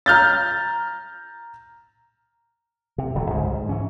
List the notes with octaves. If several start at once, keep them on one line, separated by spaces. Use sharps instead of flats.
A#5 F6 G6 A6
C3
D#1 D3 F#3
C#2 G#2 G#3
G#2
E3 C#4